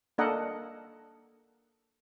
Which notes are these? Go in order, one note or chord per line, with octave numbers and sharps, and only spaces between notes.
A#3 D4 A4 A#4 D#5 F#5